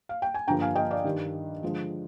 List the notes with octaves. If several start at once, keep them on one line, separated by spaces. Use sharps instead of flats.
F5
G5
G#5
G2 D3 F3 A#3 G5 A#5
F5 G#5
D#5 G5
D5 F5
G2 D#3 G3
D3 F3 G#3